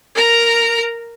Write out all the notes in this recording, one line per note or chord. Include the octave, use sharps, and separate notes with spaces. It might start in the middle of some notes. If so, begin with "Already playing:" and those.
A#4 A#5